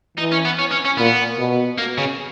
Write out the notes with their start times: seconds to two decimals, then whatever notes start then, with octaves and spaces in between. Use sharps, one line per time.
0.17 E3 D#4
0.32 C#4
0.45 B3
0.59 C#4
0.71 C#4
0.85 C#4
0.97 A#2 B3
1.39 B2
1.78 A#3
1.98 C#3